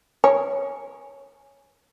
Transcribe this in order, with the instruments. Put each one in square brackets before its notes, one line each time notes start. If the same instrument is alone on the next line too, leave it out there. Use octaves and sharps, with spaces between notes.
[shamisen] C#5 [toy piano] G#5